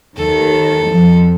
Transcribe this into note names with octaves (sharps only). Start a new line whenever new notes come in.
D#2 D#3 A4
F2 F3